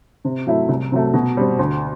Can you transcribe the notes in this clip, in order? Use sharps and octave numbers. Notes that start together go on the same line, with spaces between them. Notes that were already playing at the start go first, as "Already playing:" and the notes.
C3
F#3 A3 E4
C2
C3 F#3 A3
B2
G3 C4
D2